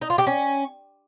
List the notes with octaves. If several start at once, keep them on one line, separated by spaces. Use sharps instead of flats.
D#4
F4
G4
C#4